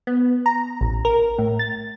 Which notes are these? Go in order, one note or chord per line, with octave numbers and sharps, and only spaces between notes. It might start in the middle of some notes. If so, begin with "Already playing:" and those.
B3
A#5
A1
A#4
A2
A6